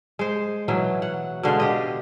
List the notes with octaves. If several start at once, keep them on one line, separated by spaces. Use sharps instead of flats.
G#3 C5
B2 E3 F#3
F#5
B2 D3 G#3 F5
G4 D#5